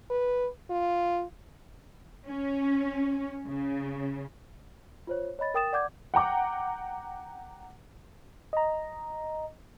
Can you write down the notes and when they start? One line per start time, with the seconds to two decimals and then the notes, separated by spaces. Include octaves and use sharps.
0.10 B4
0.70 F4
2.27 C#4
3.48 C#3
5.07 F4 C5 C#5
5.39 C#5 D#5 B5 A6
5.54 A#4 G5 D#6 A6 E7
5.73 D5 F#5 D6 G6 G#6
6.14 F#5 G5 A#5 D6
8.53 D#5 A#5